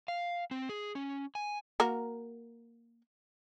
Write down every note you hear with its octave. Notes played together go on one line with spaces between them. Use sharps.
F5
C4
G#4
C#4
G#5
A#3 F#4 A#4